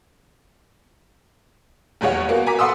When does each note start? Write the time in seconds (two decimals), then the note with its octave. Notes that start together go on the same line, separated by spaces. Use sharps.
2.01 F#1 E2 G3 G#4 C#5 F#5
2.29 A#3 B3 F#4
2.46 G#5 A#5 D6 B6
2.59 A4 B4 F#5 C6 D#6 E6